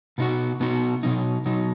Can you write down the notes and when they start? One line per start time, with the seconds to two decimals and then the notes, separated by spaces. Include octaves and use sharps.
0.18 B2 B3 D#4 F#4
0.60 B2 B3 D#4 F#4
1.03 B2 F#3 D#4
1.46 B2 F#3 D#4